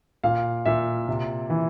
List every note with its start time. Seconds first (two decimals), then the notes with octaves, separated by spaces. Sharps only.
0.24 A#2 F5
0.65 A#2 E5
1.08 C3
1.50 E3